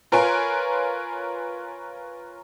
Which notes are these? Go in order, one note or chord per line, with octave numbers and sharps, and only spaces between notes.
F4 A#4 B4 C#5 G#5 C6